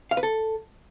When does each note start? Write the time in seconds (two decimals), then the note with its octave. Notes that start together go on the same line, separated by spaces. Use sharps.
0.11 F5
0.17 B4
0.23 A4